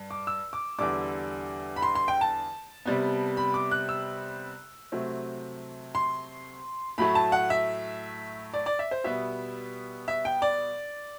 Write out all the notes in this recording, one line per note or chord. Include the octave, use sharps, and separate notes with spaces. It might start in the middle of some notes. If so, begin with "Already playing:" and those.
Already playing: G2
D6
E6
D6
E2 D3 G3 D6
B5
C6
C6
G5
A5
C3 G3 B3
B5
D6
F#6
E6
C3 F#3 A3 C4
C6
A2 F#3 A3 B5
A5
F#5
E5
D5
D5
E5
C5
B2 G3 B3 E5
E5
G5
D5